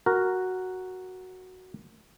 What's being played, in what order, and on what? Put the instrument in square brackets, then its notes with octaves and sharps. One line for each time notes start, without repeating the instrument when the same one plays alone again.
[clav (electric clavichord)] F#4 A#4